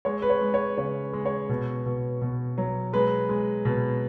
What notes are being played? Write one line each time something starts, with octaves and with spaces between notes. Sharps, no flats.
G#3 C#5
B4
C#5
G#3
C#5
C#3 C#5
G#3
C#5
B2
B2
B2
F#3
G#3 B4
G#3
B2